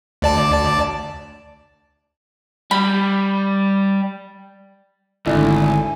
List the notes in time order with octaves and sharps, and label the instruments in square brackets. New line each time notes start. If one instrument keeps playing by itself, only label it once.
[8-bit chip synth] D2 D5 A5
[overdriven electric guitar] G3 [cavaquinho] B5
[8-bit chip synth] G#1 [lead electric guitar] D2 [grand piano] D4 E4 A4 [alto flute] G#5